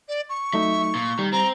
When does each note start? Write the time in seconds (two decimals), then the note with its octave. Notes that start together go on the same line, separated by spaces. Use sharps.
0.08 D5
0.29 C#6
0.53 F#3 A3 D#4 E5
0.95 A#2
1.19 D#3 G3
1.33 C4 A#5